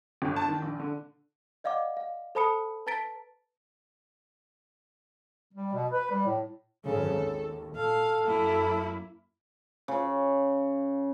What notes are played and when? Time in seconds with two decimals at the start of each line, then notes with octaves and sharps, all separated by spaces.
0.22 G1
0.36 A5
0.48 D#3
0.62 A#1
0.79 D3
1.64 D5 D#5 F5 F#5 D6
1.97 F5
2.35 A4 C5 A5 B5 D#6 C#7
2.86 B4 A5 A#5 A6 B6 D7
5.53 G3
5.73 B2
5.91 B4
6.11 G3
6.26 A2
6.85 G#1 F#2 C#3 A4
7.15 D#2
7.76 A#2 A4 F5
8.26 F#2 A#3 E4
9.88 C#3